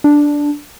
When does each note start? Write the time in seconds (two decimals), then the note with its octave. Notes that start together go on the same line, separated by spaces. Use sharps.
0.04 D4